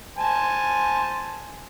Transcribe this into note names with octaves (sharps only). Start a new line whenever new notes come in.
C5 G#5 A5